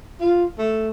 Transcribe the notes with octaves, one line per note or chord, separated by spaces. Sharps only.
F4
A3